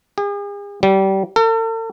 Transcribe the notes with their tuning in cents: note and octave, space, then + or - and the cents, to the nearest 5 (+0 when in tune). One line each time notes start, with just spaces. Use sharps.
G#4 -45
G3 -25
A4 +45